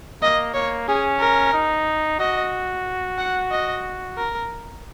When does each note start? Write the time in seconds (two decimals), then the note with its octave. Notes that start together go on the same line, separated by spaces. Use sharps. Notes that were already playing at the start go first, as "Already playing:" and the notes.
0.22 A#3 D#5
0.54 A#3 C#5
0.88 C#4 G#4
1.20 A#4
1.53 D#4
2.20 F#4 D#5
3.18 F#5
3.51 D#5
4.17 A#4